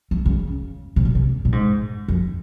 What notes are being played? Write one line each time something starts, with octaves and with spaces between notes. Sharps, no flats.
E3
C#3
C3
A#2
C3
A#2
G#2
F2